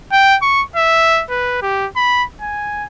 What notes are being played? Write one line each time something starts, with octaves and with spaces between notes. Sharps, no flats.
G5
C#6
E5
B4
G4
B5
G#5